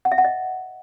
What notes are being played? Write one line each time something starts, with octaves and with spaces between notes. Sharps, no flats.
F#5
E5
F#5
D#5